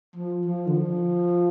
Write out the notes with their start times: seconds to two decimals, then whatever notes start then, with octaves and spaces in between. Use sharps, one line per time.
0.16 F3
0.45 F3
0.67 D3
0.74 F3